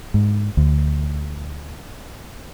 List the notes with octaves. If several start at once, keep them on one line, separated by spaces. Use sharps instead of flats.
G#2
D2